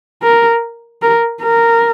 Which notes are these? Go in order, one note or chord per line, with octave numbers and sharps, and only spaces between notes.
A#4
A#4
A#4